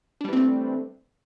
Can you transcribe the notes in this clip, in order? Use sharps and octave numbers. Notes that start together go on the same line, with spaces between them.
E3 G3 A3 C4 D4